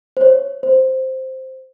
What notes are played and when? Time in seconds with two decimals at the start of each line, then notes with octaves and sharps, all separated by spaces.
0.17 C5
0.21 C#5
0.63 C5